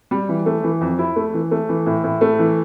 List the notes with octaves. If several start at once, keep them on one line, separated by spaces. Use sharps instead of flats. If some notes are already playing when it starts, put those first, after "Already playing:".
G3
E3
A3
E3
F2
E4
A3
E3
A3
E3
A2
A2
A3
E3